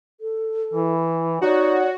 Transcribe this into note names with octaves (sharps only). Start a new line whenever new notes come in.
A4
E3 E4
D#4 F#4 C#5 D5